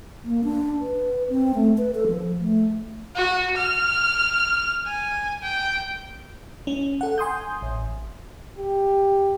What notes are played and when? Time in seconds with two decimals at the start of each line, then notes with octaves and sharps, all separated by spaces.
0.25 A#3
0.44 D4
0.80 B4
1.29 C4
1.54 A3
1.78 B4
1.95 A4
2.07 F3
2.40 A3
3.16 F#4
3.57 F6
4.86 G#5
5.42 G5
6.67 C#4
7.01 A4 F#5
7.18 G#5 C6 D#6 G6
7.62 A1
8.58 G4